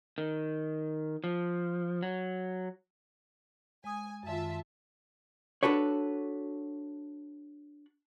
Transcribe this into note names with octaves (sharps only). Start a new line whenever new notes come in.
D#3
F3
F#3
G#3 G#5 D#6
F#2 D#3 F4 E5 A5
D4 F#4 A4 B4 C#5